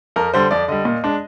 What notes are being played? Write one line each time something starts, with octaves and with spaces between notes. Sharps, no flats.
F2 A#4
D3 G3 C5
F2 D5
D3 G3 D#5
A#2
G#3 D4